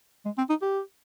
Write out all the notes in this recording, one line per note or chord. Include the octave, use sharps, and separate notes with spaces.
G#3
C4
D#4
G4